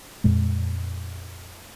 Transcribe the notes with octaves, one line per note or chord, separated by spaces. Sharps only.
F2 A#2 G#3